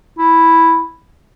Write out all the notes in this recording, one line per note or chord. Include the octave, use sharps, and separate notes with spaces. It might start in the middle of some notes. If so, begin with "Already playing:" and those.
E4